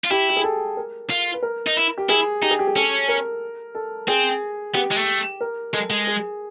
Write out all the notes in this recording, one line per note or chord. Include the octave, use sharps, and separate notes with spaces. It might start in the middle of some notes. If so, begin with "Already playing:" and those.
F4
E4 G4
G4
G#4
A4
A#4
F4
B4
A#4
D#4
E4
G4
E4 G#4
D#4 G4
G#4
G4
G#4
C#4 A4
A#4
A4
C4 G#4
B3 G4
G#3
A3
A#4
G#3 A4
G#3
G#4